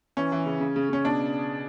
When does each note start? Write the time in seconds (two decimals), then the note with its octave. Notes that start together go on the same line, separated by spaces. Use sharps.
0.17 E3 C#4
0.32 E3
0.46 C#3
0.60 C#3
0.76 C#3
0.89 C#3 C#4
1.04 B2 D4